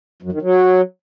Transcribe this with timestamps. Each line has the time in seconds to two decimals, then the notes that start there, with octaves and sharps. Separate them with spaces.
0.23 F#2
0.32 D#3
0.42 F#3